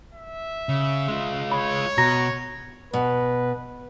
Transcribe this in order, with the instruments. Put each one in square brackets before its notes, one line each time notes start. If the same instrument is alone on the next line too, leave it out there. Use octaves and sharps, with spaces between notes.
[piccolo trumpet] E5
[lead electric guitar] C#3
G#3 F4
[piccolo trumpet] C#5 [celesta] B5
[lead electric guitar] B2 [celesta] F#4 A#5 A#6
[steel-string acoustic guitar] B2 [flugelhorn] B4